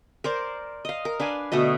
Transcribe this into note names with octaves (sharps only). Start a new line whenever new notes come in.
A#4 C5 D5
D#5 F5
A#4
D4 B4 F5 G#5
B2 D3 A3 D#5